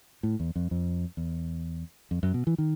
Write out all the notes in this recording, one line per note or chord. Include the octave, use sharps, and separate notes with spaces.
A2
E2
F2
F2
E2
F2
F#2
B2
E3
D#3